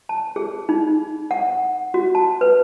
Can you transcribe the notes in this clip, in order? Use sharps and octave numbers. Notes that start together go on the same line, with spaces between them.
A5
G#4
D#4
F#5
F#4
A5
B4